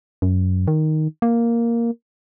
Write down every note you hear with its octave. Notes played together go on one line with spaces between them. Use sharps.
F#2
D#3
A#3